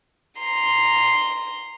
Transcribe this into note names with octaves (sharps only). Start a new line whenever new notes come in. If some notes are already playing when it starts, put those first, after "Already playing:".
A#5 C6